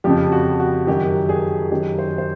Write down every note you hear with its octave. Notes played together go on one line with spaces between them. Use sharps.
F2 C#3 F3 G4
F#4
F#4
F#2 D#3 F#3 G4
G#4
F#2 D#3 F#3 G4
C5
C5